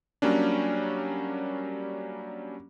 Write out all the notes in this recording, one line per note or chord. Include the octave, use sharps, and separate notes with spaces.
F#3 G3 A#3 C#4 D4